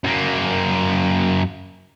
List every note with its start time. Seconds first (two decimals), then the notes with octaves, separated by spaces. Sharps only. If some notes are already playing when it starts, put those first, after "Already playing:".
0.04 F#2 A#3